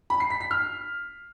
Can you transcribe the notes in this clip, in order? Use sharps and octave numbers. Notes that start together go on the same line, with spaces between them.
B5
C7
B6
B6
F6